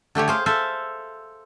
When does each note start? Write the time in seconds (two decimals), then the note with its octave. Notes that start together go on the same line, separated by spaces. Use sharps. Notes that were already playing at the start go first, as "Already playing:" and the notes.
0.15 D3 A3 G4 C#5
0.28 G#4 C5 F5
0.46 A4 C5 E5 F5